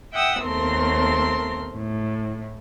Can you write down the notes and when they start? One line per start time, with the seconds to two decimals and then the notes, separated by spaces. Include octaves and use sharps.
0.12 E5 F#5 G5 D#6 E6
0.44 D#2 A3 B3 C4 A#4 C6
1.73 A2